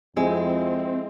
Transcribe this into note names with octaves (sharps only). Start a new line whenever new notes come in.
F2 G#3 C4 E4